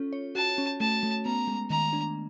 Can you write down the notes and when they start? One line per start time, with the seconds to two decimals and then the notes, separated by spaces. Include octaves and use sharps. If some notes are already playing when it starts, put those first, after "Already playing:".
Already playing: C#4 F4 A4
0.13 C#5
0.35 F#4 A5
0.58 C#4
0.80 A3 A5
1.03 A3
1.25 B3 A#5
1.48 G#3
1.70 D#3 A#5
1.93 D4